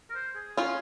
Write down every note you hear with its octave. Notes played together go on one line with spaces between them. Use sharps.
A#4
C5
G#4
C#4 F4